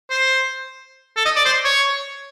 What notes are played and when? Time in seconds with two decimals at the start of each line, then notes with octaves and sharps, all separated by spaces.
0.10 C5
1.16 A4
1.25 D#5
1.36 D5
1.45 C5
1.64 C#5